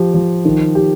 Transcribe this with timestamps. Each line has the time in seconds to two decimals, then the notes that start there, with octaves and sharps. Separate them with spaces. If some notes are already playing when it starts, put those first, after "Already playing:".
Already playing: F3 G4
0.14 F3
0.45 D#3
0.75 G4